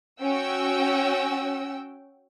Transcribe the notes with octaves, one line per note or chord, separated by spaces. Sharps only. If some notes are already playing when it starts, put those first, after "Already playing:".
C#4 F#4 G5 E6